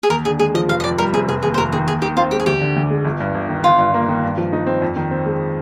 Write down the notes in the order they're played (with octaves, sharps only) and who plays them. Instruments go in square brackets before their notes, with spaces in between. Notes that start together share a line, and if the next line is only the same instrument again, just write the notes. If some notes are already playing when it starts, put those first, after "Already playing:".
[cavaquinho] G#4
[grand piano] D#2 [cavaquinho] A#4
[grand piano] D3 [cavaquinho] G#4
[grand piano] G#3 [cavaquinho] G#4
[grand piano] F3 [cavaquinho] D#5
[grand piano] F1 [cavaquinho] F5
[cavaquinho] D#5
[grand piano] F2 [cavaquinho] D5
[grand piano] G3 [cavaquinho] A#4
[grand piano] C3 [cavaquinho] G#4
[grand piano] F1 [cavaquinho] G#4
[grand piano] D#2 [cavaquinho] G#4
[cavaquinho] C5
[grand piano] F1 [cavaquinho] A#4
[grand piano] D#3 [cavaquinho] G#4
[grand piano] D#2 [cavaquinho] G#4
[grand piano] D#3 [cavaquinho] G4
[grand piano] C4 [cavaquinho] F4
[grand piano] G#3 [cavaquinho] G4
[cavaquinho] G#4
[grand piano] D2 [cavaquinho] G4
[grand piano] D3
D2
G#3
G1
G2
G1
D#3
[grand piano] G1 [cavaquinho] F4
[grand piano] G2
A#3
D#3
G2
F3
D#4
C4
F2
D#3
C4
G#3